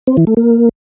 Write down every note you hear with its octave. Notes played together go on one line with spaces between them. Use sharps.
C4
E3
A3
A#3